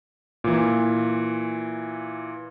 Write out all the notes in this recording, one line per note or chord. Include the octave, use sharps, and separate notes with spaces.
A#2 E3